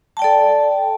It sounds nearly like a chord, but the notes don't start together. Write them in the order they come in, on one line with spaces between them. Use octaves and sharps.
A5 G5 D5 A4